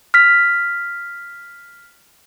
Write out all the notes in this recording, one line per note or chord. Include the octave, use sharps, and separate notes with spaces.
F6 B6